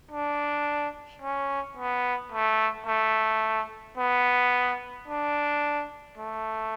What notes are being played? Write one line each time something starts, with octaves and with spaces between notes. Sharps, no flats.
D4
C#4
B3
A3
A3
B3
D4
A3